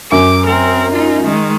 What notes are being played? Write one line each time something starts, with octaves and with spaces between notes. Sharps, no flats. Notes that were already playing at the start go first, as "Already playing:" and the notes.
F#2 D6
C4 A#4
D#4 F4
D#3 G#3